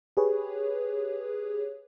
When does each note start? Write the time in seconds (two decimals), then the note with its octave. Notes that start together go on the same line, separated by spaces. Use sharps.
0.17 G4 G#4 B4 C#5